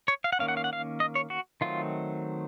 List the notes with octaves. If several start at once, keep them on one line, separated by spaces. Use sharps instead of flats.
C#5
F5
F#5
D#3 A#3 C#4 F5
F#5
F5
F#5
F5
D#5
C#5
F#4
D#3 F#3 A3 C4 F4